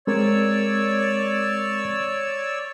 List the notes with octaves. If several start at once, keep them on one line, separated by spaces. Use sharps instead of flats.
G#3 C4 A#4 C#5 D5 E6